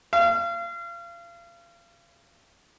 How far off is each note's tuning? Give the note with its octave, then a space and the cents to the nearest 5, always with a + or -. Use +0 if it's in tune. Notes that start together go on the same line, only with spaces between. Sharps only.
F5 -35